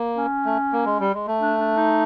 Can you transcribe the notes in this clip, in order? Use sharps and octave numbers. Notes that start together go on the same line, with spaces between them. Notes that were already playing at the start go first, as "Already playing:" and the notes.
Already playing: A#3
C#4
A3
A#3
G#3
G3
G#3
A3
D4
D4
D#4